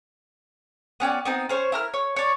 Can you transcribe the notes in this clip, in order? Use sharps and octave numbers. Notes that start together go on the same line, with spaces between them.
B3 C#4 G4 D5
B3 C4 D#4
C#4 C5 C#5
E4 A#4 F6
C#5
C#5 D5